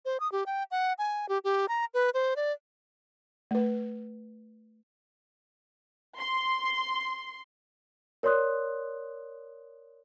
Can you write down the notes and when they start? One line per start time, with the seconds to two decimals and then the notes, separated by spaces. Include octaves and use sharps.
0.05 C5
0.20 D#6
0.32 G4
0.46 G5
0.71 F#5
0.99 G#5
1.29 G4
1.44 G4
1.69 A#5
1.94 B4
2.14 C5
2.36 D5
3.51 A3 B4
6.17 C6
8.23 A#4 C#5 D5 C6 D#6 F#6